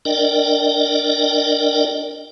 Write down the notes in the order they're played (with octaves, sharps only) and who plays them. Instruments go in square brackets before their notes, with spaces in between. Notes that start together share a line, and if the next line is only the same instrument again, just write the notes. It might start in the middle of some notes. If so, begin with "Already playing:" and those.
[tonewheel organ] D4 A#4 D5 D#5 G5